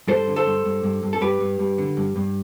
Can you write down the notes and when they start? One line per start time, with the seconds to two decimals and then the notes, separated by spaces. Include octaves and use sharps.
0.08 G2 A4 C5
0.27 D3
0.36 A4 C5
0.46 G2
0.65 G2
0.83 G2
1.03 G2
1.13 A4
1.21 G2 G4 B4
1.40 G2
1.59 G2
1.78 D3
1.97 G2
2.16 G2